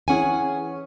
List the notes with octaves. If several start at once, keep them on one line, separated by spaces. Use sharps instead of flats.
E3 C#4 G#4 F#5 G#5